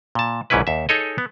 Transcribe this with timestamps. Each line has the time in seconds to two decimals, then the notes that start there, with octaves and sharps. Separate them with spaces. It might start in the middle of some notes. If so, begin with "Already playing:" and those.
0.15 A#2 A5
0.50 A#1 G#2 E3 C#4 E4 B4
0.67 D#2 E5
0.89 D#4 G#4 A4 C#5 D#5
1.18 B3